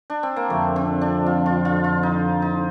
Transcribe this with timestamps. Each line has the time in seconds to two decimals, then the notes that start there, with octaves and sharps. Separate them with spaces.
0.10 D4
0.23 C4
0.36 A#3
0.50 F2 D3 F3 A3
0.76 C4
1.01 D4
1.26 F4
1.46 F4
1.65 F4
1.84 F4
2.03 D#4
2.42 D#4